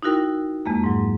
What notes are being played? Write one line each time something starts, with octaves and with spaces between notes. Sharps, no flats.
D#4 E4 F#4 A#4 G5
F2 G#3 A#3
G#2 F#3